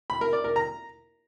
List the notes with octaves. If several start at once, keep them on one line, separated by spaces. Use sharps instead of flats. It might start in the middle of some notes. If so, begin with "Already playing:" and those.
B5
A#4
D5
A#4
A#5